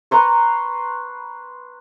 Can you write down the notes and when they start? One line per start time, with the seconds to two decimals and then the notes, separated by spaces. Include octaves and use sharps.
0.11 B4 A#5 C6 C#6